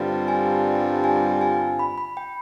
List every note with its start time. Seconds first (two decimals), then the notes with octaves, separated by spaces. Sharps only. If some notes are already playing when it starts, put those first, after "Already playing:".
Already playing: G2 D3 G3 C4 F4 F5
0.28 G#5
1.04 G#5
1.41 G#5
1.79 B5
1.98 B5
2.17 G5